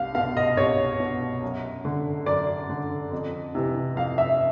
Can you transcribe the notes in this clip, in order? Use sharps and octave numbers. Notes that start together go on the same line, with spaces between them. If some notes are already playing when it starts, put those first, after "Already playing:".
Already playing: C2 F5
B2 F5
D#5
C2 C#5
B2
F#2
D3
F#2 D5
D3
F2
C3 E3
F2 F5
E5